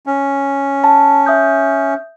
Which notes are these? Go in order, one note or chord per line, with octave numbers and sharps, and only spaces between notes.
C#4
A5
E5 D#6 G6